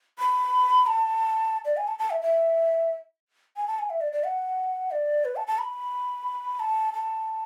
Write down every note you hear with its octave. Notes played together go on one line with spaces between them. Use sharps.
B5
A5
D5
G#5
A5
A5
E5
E5
G#5
A5
G#5
E5
D5
D5
F#5
D5
B4
A5
A5
B5
A5
A5